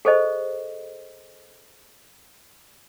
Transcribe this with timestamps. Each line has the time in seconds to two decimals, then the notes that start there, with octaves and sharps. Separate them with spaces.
0.05 G#4 A4 C5 D#5